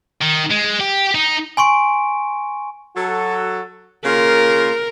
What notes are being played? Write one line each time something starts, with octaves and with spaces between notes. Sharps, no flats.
D#3
G#3
G4
D#4
G#5 C6 C#6 D7
F#3 F#4 A4
C#3 A#3 F4 A#4